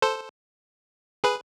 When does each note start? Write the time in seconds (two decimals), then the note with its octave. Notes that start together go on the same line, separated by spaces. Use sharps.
0.02 A4 C5
1.24 G#4 B4